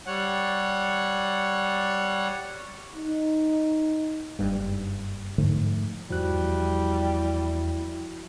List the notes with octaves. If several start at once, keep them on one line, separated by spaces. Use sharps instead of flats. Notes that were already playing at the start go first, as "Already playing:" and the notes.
G3 C#5 F#5
D#4
F#1 G2
G#2 D3 F3 A3
E2 F3 G3 E4 F#4 F#6